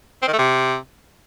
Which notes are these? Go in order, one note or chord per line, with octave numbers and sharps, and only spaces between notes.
C4
D#3
A3
C3